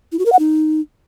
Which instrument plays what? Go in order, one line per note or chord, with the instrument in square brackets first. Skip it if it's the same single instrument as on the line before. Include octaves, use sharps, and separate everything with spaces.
[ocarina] E4
F#4
A#4
F#5
D#4